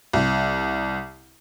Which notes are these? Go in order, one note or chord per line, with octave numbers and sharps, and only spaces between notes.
C2